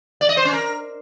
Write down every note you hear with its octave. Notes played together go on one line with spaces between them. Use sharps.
D5
D#5
C5
C#4
A#4